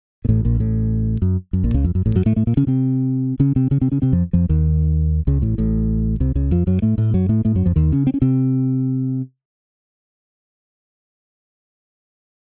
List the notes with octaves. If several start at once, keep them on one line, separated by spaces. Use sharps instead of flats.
A#2
A1 A2
A#1 A#2
A1 A2
F#2
F#2
A#1 A#2
C#2 C#3
F2
F#2
A1 A2
F#2 F#3
A2 A3
A2 A3
A#2 A#3
C#3 C#4
C3 C4
C#3 C#4
C3 C4
C#3 C#4
C3 C4
C#3 C#4
C3 C4
F2 F3
F2 F3
D#2 D#3
C#2 C#3
A1 A2
A1 A2
C2 C3
C#2 C#3
F2 F3
F#2 F#3
A2 A3
A2 A3
F#2 F#3
A2 A3
A2 A3
F#2 F#3
F2 F3
D#2 D#3
C#3 C#4
C4
C#4
C3 C4